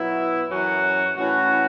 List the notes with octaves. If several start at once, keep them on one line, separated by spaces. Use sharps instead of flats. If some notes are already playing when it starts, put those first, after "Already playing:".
Already playing: B2 F#3 B3 E4
F#2 E3 C#4 F#4
A2 E3 C#4 F#4